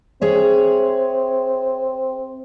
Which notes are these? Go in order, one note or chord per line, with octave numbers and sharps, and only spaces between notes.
C4 G#4 C#5 E5